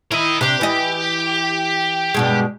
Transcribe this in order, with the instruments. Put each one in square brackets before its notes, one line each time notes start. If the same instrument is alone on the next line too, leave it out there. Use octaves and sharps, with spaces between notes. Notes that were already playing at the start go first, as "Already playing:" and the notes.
[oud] E4 [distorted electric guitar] A#4 D#5
[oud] C3 D4 [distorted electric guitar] G4
[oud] E3 D#5
G2 B2 G#3